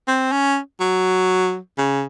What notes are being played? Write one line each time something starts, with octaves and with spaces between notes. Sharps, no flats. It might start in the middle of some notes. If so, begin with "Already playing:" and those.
C4
C#4
F#3
C#3